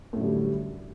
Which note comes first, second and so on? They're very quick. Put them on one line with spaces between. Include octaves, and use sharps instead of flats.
A2 F#2 D3 G3